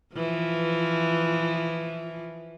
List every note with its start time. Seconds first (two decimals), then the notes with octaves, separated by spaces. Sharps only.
0.15 E3 F3